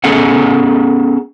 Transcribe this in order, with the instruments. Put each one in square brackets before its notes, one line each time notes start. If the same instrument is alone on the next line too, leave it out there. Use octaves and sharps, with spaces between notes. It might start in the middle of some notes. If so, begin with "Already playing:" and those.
[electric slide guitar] B3 C#4 G#4 A4 F#5